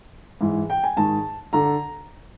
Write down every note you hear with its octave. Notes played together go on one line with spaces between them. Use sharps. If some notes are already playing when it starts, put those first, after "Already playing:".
G#2 E3
G5
G#5
G#2 D#3 A5
D3 A#5